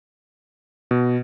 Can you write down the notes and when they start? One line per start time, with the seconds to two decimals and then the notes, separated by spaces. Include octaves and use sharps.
0.91 B2